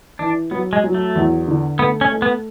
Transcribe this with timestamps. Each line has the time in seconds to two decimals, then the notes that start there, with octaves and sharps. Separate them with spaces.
0.19 E3 D4
0.51 F#3 B3
0.73 G#3
0.84 F#3
0.94 A3
1.15 E2
1.48 D3
1.79 A3 B3
2.01 C#4
2.12 A3
2.22 B3